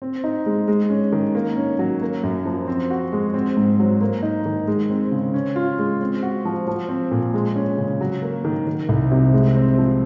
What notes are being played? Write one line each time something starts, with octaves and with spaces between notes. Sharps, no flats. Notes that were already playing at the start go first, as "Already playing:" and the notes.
C4
D#4
G#3
G#3
C#4
D#3
A#3
C#4
F#3
A#3
F#2
F3
C4
F#4
G#3
C4
G#2
F#3
A#3
D#4
D#3
G#3
C4
C#3
C#4
F4
G#3
C4
F#4
F3
F3
C4
A#2
G#3
C#4
C#3
F#3
A#3
D#3
D#3
C2
C3
G#3
C4
F3